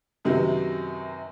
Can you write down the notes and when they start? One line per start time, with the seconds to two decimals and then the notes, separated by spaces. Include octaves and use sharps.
0.25 F#2 C3 D#3 F#3 B3